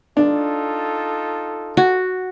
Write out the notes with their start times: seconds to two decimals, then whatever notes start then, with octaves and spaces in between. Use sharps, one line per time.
0.17 D4 D#4 F4 A4
1.77 F#4